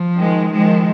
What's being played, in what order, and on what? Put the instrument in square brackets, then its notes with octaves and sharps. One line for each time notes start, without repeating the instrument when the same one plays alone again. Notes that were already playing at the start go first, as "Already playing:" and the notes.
Already playing: [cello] F3
[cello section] D#3 G#3
[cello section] D#3 G#3 [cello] F3